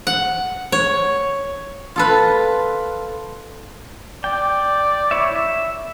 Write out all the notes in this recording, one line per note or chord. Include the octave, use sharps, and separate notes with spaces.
F#5
C#5
F4 A4 B4
D5 G5
E4 C#5 E5
E5